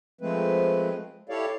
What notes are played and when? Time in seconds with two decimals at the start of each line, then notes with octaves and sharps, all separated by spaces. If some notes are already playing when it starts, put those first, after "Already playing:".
0.21 F3 G#3 A3 C4 B4
1.29 E4 G4 A4 C#5 D5 F5